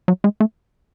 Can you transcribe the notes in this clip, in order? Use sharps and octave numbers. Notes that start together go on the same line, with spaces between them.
F#3
G#3
A3